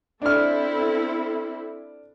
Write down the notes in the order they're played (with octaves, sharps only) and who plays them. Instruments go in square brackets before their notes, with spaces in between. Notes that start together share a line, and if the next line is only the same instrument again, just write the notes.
[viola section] C4 E4 A4 [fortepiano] D4 F6